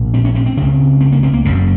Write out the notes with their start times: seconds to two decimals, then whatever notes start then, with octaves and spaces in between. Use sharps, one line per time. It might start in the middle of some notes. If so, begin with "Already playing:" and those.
Already playing: A#1 A#2
0.14 C4
0.25 C#4
0.35 C4
0.46 C4
0.57 C#2 C#3 C4
1.00 C4
1.12 A#3
1.23 C4
1.33 A#3
1.45 F#1 F#2 C#3